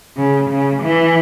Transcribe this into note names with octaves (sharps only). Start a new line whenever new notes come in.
C#3
C#3
E3